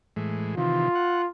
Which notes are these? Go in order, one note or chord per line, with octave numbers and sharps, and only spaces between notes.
A2 E3 G#3
C3 D#3 E3 F4
F#5